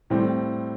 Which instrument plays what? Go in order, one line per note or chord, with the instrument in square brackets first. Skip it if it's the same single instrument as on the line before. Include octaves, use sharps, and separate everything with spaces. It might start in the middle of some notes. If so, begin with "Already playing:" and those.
[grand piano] A2 G3 C4